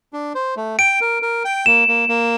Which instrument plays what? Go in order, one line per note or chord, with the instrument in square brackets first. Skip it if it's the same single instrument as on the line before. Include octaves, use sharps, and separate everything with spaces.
[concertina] D4
C5
A3
[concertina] G5 [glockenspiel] D7
[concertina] A#4
A#4
G5
[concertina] A#3 [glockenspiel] E7
[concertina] A#3
A#3